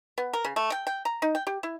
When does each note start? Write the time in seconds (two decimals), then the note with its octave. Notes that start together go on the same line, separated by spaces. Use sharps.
0.18 B3
0.33 A#4
0.44 C#3
0.56 A3
0.72 G5
0.87 G5
1.05 A#5
1.22 D#4
1.35 G5
1.47 G4
1.63 E4